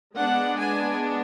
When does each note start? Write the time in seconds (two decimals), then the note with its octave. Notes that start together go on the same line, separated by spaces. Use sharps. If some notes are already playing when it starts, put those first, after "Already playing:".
0.15 G#3 B3 D4 F#5
0.58 G#5